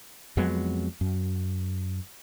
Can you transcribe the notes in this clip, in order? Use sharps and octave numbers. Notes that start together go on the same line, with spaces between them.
F2 F#3 G#3 B3
F#2